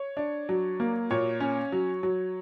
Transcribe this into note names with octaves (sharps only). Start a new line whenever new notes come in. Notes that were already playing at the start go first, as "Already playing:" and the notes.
Already playing: C#5
D4
F#3
A#3
A#2 C#5
C#4
F#3
F#3